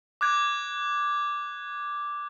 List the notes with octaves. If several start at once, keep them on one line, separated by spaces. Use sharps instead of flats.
D6 F#6 G#6